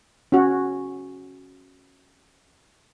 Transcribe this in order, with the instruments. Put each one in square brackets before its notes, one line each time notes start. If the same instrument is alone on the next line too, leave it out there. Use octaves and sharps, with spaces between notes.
[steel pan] C#4 F#4